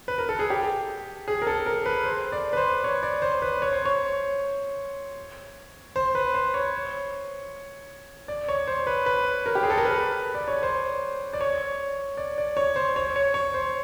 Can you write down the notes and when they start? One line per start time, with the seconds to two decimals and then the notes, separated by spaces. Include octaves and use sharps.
0.08 B4
0.18 A#4
0.29 A4
0.39 G#4
0.50 G4
1.28 G#4
1.42 A#4
1.47 A4
1.66 A#4
1.86 B4
2.05 C5
2.32 D5
2.53 B4
2.57 C5
2.84 C#5
3.03 D5
3.22 C5
3.42 B4
3.62 C#5
3.73 C5
3.85 C#5
5.96 C5
6.15 B4
6.34 C5
6.54 C#5
8.28 D5
8.49 C#5
8.67 C5
8.87 B4
9.06 B4
9.46 A#4
9.55 G4
9.63 G#4
9.70 A4
9.78 A#4
9.85 B4
10.35 D5
10.48 C#5
10.63 C5
11.33 D5
11.41 C#5
12.17 D5
12.38 D5
12.57 C#5
12.76 C5
12.96 C#5
13.16 C#5
13.34 C#5
13.54 C5